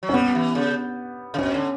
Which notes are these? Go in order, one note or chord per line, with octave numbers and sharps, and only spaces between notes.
F#3
C#4
G3 B3
E3
C#3
C#3
B2 C#4
D3